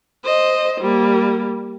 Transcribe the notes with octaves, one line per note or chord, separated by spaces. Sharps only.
C5 D#5
G3 A#3